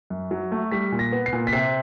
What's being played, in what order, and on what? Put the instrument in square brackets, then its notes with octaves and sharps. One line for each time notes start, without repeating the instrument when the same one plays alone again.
[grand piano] F#2
F#3
A3
G3 B6
A#2
A#6
B3
C7
A#2
B6
C3 C7